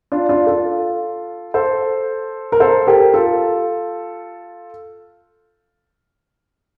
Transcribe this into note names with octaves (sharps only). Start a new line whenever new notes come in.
D4 F4
D4 F4
F4 A4
A4 C5
A#4
A4 C5
G4 A#4
F4 A4